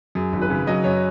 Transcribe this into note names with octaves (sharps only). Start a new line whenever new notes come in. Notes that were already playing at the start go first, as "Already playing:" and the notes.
F#2 G#4
G#1
B4
C#3
F#3 D#5
F#2 C#5